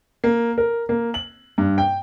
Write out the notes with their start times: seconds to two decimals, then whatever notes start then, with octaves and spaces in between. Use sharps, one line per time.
0.24 A#3
0.58 A#4
0.89 A#3
1.14 F#7
1.58 G2
1.78 G5